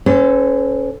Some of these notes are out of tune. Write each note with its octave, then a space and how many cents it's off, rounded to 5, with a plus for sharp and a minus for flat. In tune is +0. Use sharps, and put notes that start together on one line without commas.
C#4 +0 A4 +0 C5 -45